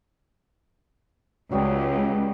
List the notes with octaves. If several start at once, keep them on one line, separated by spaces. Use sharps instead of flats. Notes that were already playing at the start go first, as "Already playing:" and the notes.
C#2 F#3 G3 B3